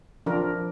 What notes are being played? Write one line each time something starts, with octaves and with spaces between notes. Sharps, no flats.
F3 D4 A#4